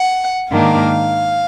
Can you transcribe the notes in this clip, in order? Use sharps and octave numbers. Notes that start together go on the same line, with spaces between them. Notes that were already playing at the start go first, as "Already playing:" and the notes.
Already playing: F#5
G#2 D#3 A#3 D4 F5